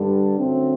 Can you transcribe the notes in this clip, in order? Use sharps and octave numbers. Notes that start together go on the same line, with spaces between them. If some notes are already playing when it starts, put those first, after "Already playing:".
Already playing: G2 D3 G3
F#2 D3 F#3 A3 C4